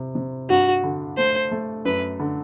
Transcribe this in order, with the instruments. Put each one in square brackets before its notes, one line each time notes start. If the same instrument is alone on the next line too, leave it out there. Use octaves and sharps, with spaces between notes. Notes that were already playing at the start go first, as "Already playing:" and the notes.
Already playing: [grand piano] C3
C3
[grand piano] G2 [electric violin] F#4
[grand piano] D3
[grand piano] A3 [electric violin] C5
[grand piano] A3
[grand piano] F#2 [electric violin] B4
[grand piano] D3